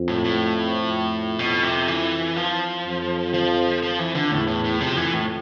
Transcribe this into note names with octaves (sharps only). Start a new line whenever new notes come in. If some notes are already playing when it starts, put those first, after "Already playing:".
Already playing: F2
A2
A2
F2
B2
C3
E3
F3
F2
F3
F3
E3
D3
E2 A2
A2
A2
F2 C3
E3
A2